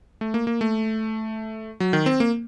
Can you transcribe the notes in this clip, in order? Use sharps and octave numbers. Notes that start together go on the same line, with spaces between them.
A3
A#3
A#3
A3
F#3
D#3
C4
A#3